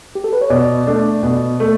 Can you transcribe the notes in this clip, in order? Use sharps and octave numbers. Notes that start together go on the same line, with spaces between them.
G4
A4
B4
C#5
B2 D5
A3 D4
B2
A3